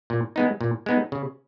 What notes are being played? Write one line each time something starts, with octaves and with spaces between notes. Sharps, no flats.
A#2
G#3 B3 D#4
A#2
G#3 B3 D#4
C#3